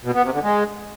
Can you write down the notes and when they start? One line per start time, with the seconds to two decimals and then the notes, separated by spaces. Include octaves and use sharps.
0.05 B2
0.15 B3
0.24 C3
0.33 D3
0.43 G#3